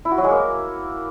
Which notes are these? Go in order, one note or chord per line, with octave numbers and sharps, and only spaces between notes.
E4
F#4
F#3
G#3
A#3